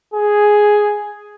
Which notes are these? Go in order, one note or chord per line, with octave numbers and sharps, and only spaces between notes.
G#4